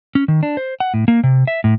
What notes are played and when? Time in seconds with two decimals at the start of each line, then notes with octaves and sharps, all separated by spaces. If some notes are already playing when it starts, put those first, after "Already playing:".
0.15 C#4
0.28 D#3
0.43 D4
0.57 C5
0.80 F#5
0.94 A2
1.08 A#3
1.24 C3
1.47 E5
1.64 A2